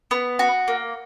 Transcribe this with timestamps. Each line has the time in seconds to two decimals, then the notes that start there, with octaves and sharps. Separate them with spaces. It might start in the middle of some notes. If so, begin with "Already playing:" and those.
0.11 B3
0.39 F#4
0.68 A#3